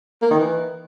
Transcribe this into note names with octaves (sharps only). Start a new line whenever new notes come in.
A#3
D#3
E3